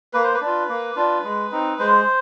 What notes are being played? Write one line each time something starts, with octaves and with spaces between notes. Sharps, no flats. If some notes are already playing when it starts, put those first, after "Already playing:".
A#3 B4
C5
B4
D4 F4
A#3
D4 F4
G#3
C4 D#4
G#3 C5